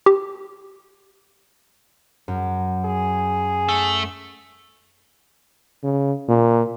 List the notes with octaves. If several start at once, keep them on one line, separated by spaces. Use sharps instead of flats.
G4
F#2
G#4
A3
C#3
A#2